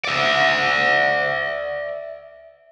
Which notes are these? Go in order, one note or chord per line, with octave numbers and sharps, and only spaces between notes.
D5 E5